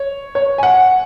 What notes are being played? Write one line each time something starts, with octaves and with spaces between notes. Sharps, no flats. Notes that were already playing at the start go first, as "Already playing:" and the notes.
Already playing: C#5
C#5
G#5
F#5